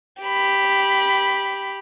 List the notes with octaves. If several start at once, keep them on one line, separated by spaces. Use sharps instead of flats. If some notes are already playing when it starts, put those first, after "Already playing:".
G4 B5